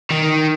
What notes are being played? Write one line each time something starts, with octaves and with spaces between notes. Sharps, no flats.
D#3